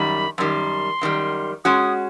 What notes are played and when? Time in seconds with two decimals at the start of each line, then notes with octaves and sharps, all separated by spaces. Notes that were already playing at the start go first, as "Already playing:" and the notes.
Already playing: F#2 D#3 G3 B5
0.38 F#2 D#3 G3 C6
1.01 F#2 D#3 G3
1.65 G#3 C#4 F#4 D#6